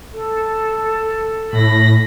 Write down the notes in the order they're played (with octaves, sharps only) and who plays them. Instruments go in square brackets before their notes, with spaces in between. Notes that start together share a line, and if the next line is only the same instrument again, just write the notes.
[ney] A4
[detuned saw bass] A2 [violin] B5 A#6